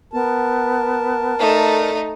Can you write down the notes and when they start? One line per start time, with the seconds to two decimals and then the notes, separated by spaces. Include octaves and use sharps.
0.13 B3 A#4 A5
1.39 A3 D#4 D5